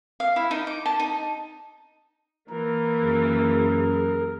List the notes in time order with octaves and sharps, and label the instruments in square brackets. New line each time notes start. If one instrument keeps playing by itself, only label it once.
[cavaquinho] F5
E4
D#4
D6
A5
D#4
[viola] E3 A#3 [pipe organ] A#4
[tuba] F#2 [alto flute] G#4